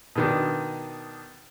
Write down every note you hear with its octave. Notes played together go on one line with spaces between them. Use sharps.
B2 D#3 D4